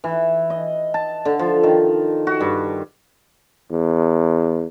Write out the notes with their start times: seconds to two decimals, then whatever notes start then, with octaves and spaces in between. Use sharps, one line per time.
0.04 E3
0.50 D#5
0.94 A5
1.25 D3
1.39 F3
1.63 D#3
2.27 F#4
2.40 G2
3.71 E2